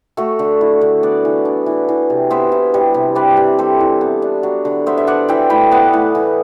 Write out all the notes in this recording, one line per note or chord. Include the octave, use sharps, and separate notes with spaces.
A3 F#4 A4
D3
E4
D3
B3 D5 F#5
E3
D4
E3
E3
C3
B3 C5 E5
E4
G3
C3
C4 B4 D5
C3
G3 A4 C5
E3
B3
D4
F#3
D3
B3 C5 E5
E5
D4 D5 F#5
E3 E5 G5
A2 G5 B5
B3 F#5 A5
A2
E3